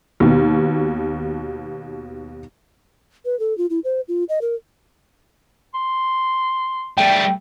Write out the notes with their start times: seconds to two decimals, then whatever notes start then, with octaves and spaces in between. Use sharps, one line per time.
0.20 D#2 B2
3.25 B4
3.40 A4
3.58 F4
3.70 E4
3.84 C5
4.08 F4
4.29 D#5
4.41 A#4
5.75 C6
6.98 G3 A3 G5